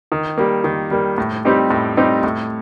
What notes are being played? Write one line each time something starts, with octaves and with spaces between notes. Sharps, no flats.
D#3
G3 A#3
D#3
G3 A#3
A2
G3 C4 D#4 G4
A2
G3 C4 D#4 G4
A2